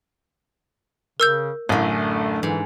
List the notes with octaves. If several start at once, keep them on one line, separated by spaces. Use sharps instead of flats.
C#3 A#4 E6 G6
A1 F#2 D3 A3
G#2 E3